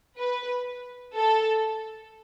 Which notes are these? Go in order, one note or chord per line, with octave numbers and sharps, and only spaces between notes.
B4
A4